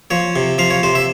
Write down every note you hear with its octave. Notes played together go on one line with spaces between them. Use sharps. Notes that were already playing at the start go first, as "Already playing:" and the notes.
F3 C#5
C3
F3 F5
C#5
C3 C5
E5